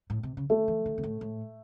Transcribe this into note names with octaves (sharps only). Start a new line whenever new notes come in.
A2
C3
C#3
D#3 A3
E3
D#3
C3
A2
A2